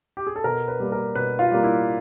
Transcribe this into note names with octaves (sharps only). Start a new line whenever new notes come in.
G4
G#4
A4
B2 A#4
B4
G3 A#3
A#4
B2 B4
F4
G3 A#3
E4